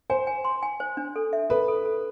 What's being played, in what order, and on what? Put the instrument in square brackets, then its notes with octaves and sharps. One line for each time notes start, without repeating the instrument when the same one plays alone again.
[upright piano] C5 [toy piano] G#5
[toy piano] G#5
C6
G#5
C5
D4
A4
E5
[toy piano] A4 [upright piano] B4
[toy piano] A4
A4